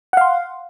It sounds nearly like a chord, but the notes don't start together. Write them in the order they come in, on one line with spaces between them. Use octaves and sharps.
F#5 F5 C6